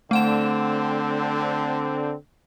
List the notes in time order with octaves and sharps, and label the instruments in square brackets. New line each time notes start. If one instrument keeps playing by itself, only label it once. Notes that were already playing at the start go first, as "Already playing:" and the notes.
[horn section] D3 C4 [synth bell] A3 F#5 E7